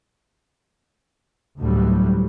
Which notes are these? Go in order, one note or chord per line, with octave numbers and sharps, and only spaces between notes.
D2 A2 D3 F#3 G3